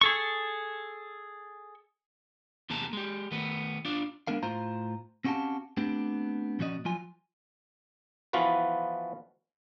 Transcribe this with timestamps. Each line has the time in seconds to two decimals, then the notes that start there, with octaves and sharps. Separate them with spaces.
0.01 G#4 A4 C#6
2.70 E2 C3 A#3 G#4 A5 A#5
2.93 G#3 G4
3.31 D#3 A3 B3
3.85 D4 F4 D5
4.27 G#3 B3 D4 A#4 F5
4.43 A2 F4 C5 F5 A#5
5.24 C4 C#4 F#4 G4 F5 A5
5.77 A3 B3 C4 D4 G4
6.59 A#2 F3 C#4 F#4 D5 D#5
6.85 F3 F#3 F4 G#5
8.33 E3 F3 B3 F4 F#4 B4